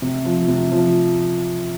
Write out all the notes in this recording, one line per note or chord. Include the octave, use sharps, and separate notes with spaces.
C3
F3
C3
F3